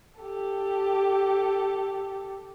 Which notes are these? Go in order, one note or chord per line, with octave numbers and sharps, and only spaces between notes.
G4 A4